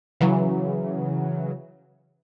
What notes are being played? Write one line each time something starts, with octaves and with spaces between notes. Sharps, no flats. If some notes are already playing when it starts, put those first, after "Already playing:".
C#3 E3 F#3